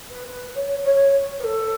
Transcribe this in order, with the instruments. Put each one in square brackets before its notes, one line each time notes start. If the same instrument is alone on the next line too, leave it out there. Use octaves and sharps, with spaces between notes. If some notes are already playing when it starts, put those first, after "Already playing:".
[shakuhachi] B4
B4
C#5
C#5
B4
A4